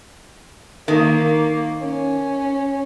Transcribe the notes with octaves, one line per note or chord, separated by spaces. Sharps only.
D#3 A#3
C#4